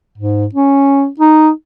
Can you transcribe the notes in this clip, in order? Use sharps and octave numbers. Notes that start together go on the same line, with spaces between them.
G#2
C#4
D#4